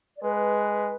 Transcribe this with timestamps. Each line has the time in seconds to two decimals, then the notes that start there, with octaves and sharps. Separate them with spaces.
0.16 D5
0.23 G#3 B4